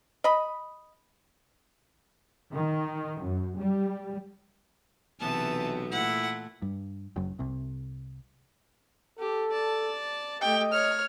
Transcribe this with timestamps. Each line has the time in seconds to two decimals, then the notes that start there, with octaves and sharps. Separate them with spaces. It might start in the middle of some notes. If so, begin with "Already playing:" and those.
0.24 D#5 B5
2.51 D#3
3.20 F#2
3.58 G3
5.20 B1 C3 E3 B3 A5
5.92 A#2 A3 E4 F#5
6.62 G2
7.16 F#1 F#2
7.39 C2 C3
9.19 G4 A4
9.52 D5 A5
10.41 A3 G4 D#5 G5
10.72 C#5 F6